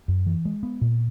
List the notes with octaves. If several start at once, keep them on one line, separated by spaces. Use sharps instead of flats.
F#2
E3
G#3
B3
A#2